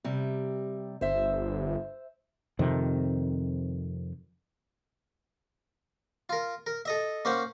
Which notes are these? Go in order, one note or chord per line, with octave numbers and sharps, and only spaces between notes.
C3 G3
G1 C5 E5
F2 C3 D#3
F4 A#4
A#4
A4 D#5 E5
A#3 C#4 C5 F#5